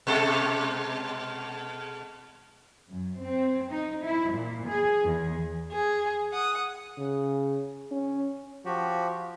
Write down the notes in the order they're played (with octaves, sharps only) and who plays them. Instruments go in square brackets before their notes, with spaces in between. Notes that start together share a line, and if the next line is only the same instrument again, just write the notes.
[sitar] B2 G#3 A4
[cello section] F#2
C4
D#4
E4
A#2
G#4
E2
[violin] G#4
F#5 D#6
[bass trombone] C#3
C#4
[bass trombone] F3 [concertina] F#4 G4